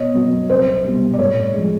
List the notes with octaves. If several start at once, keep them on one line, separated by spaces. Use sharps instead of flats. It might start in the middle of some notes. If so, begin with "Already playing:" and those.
Already playing: B2 C#5 D#5
F#3 B3
C2 C5
B2 G3
D5
A2 C#5
F3 G#3